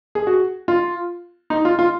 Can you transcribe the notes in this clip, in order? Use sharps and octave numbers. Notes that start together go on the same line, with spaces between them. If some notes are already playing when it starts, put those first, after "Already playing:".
G#4
F#4
F4
D#4
F4
F4